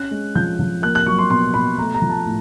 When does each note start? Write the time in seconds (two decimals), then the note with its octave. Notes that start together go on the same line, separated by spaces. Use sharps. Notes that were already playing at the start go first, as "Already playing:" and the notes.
Already playing: C#4 F#6
0.11 G#3
0.35 F3 G6
0.59 F3
0.82 A#3 F#6
0.95 F#6
1.06 F#3 C#6
1.18 C6
1.30 B2 C6
1.54 B2 B5
1.78 A3 A#5
1.94 A#5
2.02 F3
2.09 A5
2.25 A2